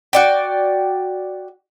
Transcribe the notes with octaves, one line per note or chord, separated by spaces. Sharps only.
F#4 D5 G5